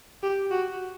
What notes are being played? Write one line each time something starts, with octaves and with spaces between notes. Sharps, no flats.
G4
F#4